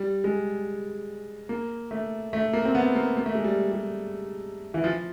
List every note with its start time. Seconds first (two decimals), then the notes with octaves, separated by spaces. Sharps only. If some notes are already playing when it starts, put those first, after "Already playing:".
Already playing: G3
0.24 G#3
1.49 A#3
1.91 A3
2.33 A3
2.53 A#3
2.65 C4
2.75 B3
2.95 A#3
3.17 A#3
3.26 A3
3.35 G#3
3.44 G3
3.72 G3
4.74 E3
4.84 F3